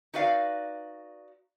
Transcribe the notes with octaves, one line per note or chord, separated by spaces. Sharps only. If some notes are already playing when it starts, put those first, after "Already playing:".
D#4 F#4 B4 D5 F5